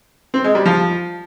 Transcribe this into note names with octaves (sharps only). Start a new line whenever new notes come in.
C4
G#3
G3
F3